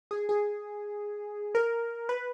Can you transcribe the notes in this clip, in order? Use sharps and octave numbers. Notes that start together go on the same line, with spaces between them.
G#4
G#4
A#4
B4